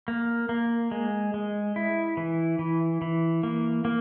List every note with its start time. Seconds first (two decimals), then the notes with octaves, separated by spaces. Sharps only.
0.08 A#3
0.49 A#3
0.91 G#3
1.34 G#3
1.76 E4
2.17 E3
2.59 E3
3.02 E3
3.43 A#3
3.85 A#3